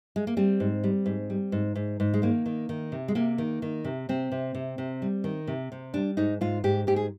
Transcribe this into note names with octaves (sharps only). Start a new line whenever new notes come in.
G#3
A#3
G3 C4
G#2
G3
G#2
G3
G#2
G#2
G#2
G#3
D#3 A#3
D#3
D#3
C3
G#3
C3 A#3
D#3
D#3
C3
C3 C4
C3
C3
C3
G3
D#3
C3
C3
G3 D4
G#2 D#4
G#2 F4
G#2 G4
G#2 G4
G#4